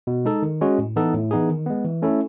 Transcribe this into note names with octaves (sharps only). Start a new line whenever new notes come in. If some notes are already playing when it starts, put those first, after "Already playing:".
B2
G#3 D#4 A4
D#3
G#3 C#4 F#4
A2
E3 B3 D#4 A4
A2
E3 B3 D#4 G#4
D#3
G#3 B3
E3
A3 C#4 E4 A4